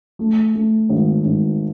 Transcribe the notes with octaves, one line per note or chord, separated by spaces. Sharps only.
A3
A3
G#1
G#1